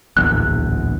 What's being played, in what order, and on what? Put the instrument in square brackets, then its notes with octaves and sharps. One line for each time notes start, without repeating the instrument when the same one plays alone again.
[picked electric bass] D1 A#1 E2 [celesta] F#6